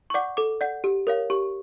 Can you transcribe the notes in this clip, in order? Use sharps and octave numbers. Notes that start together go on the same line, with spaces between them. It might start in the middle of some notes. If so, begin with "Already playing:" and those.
C#6
D5 F#5 D6
A4 D6
D5 F#5
G4
A#4 C#5 F5
G4 C#6